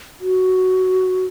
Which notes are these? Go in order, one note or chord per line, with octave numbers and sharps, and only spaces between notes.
F#4